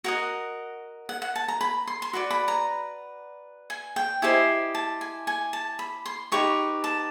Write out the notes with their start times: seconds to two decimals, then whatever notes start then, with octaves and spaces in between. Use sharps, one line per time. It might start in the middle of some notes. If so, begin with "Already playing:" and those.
0.04 F#4 A#4 D#5 F#5
1.09 F#5
1.22 F#5
1.36 A5
1.48 A#5
1.61 B5
1.87 C6
2.02 C6
2.13 F#4 B4 D5 B5
2.31 B5
2.48 A#5
3.70 G#5
3.96 G5
4.22 E4 G4 C5 D#5 G#5
4.75 A5
5.01 G#5
5.27 G#5
5.53 A5
5.79 B5
6.06 C6
6.32 D#4 G4 B4 C#6
6.84 A5